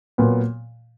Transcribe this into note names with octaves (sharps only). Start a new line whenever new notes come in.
A#2 F#3 B3